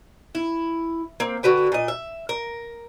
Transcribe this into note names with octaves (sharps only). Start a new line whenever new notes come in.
E4
A#3 C4
D3 F#4 B4 G5
A#2 D#5
E5
A#4